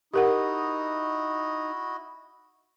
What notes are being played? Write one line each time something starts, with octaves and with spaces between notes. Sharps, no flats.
D#4 E4 F#4 G4 A#4 D#5 F#5